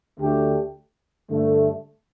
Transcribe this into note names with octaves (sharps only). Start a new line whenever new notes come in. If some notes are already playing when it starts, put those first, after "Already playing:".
D2 D3 A3 D4 G4
G2 D3 A3